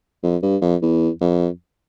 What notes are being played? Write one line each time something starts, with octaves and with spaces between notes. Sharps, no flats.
F2
G2
F2
E2
F2